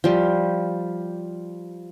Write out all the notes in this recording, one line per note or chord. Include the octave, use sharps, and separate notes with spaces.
F3 G3